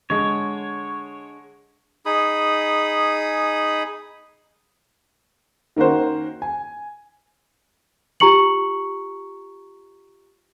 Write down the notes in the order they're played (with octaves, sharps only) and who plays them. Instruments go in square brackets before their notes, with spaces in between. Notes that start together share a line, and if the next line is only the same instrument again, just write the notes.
[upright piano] D3 G#3 [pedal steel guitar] C#5
[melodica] D#4 G#4 B5 D#6
[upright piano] D#3 A#3 C#4 F#4 C5
G#5
[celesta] F4 G4 A#5 C#6 C#7 F#7